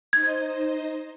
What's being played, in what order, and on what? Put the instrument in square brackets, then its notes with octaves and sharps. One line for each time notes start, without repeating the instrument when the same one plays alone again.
[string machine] D#4 C5 D#5 [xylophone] G#6